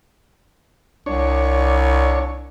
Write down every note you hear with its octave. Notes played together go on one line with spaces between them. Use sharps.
C2 D4 C#5